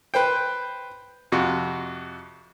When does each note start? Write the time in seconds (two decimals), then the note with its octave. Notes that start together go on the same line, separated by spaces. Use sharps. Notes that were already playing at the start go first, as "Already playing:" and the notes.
0.14 B4 C5 G5
1.32 F2 C3 F#4